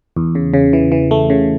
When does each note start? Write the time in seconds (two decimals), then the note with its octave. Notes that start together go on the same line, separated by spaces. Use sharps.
0.17 E2
0.35 C#3
0.54 C#3
0.73 E3
0.92 E3
1.11 A3
1.30 C#3